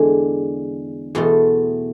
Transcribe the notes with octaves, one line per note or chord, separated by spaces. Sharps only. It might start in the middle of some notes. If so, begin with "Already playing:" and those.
Already playing: E2 D3 G#3
E2 B2 A3 C6